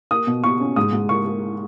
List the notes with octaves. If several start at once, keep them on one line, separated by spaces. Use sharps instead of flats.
A#3 D#6
B2
B2 C#6
C#4
G#2 D#6
G#2
A#3 C#6
A#3